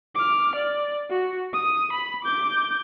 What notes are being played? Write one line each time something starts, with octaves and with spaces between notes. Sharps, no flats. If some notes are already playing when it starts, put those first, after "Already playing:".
D6 F6
D5
F#4
D#6
B5
D6 G6